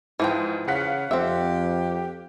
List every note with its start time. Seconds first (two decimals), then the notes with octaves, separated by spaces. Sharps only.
0.20 G#2 E3 F3 G5
0.68 C#3 F5 F#5 B6
1.11 F2 C4 G4 E5